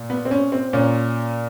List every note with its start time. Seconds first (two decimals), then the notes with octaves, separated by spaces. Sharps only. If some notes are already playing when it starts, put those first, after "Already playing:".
Already playing: A#2
0.10 B3
0.25 C4
0.31 C#4
0.52 C4
0.73 A#2 C#4